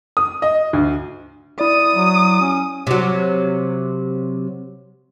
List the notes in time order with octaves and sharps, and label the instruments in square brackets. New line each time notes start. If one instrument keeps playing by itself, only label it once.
[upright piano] D#6
D#5
D2
[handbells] E4 D5 [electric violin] D#6
[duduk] F#3
C#4
[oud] C3 F#3